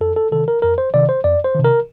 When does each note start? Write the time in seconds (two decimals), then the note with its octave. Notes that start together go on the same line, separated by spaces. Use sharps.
0.01 F2 A4
0.16 A4
0.32 C3 D#3 A4
0.48 A#4
0.62 F2 A#4
0.78 C5
0.94 C3 D#3 D5
1.09 C5
1.24 F2 D5
1.44 C5
1.55 C3 D#3
1.64 A#4